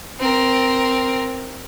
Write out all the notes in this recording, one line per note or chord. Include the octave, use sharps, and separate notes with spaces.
C4 A#4